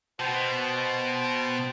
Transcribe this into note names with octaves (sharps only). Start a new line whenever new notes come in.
B2 C5 G5 A5